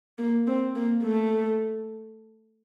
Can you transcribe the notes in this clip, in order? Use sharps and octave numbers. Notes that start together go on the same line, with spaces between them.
A#3
C4
A#3
A3